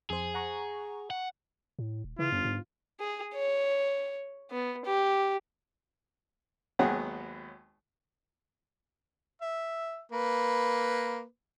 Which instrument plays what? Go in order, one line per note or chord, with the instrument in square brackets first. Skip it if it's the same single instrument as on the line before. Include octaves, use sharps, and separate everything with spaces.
[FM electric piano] F2 C5 [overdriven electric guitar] G#4
[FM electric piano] F#5 A#5 C#6
[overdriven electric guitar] F#5
[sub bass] A2
D#1
[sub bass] C#3 [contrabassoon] E3 [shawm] F4
[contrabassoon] G1 [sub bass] F#2
[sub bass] G#2
[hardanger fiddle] G#4
C#5
B3
G4
[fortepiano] G#1 D#2 F#3 B3 G#4 F#5
[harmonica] E5
A#3 B4